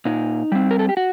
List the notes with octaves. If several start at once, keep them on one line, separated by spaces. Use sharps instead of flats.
A#2 D#4
G3 C4
A#4
A4
G4
F#4